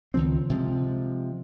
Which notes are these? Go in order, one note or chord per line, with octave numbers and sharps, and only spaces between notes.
C#2 D#3 F3 C4
C3 F3 G#3